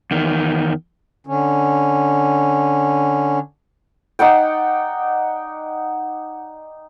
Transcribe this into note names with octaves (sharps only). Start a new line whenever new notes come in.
E2 D#3
D3 C#4
D#4 D5 F#5 G5